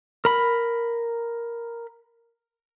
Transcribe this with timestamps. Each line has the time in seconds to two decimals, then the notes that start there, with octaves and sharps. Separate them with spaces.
0.25 A#4 B5